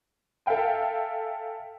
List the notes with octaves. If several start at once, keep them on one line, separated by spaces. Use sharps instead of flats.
A4 E5 F5 G5 G#5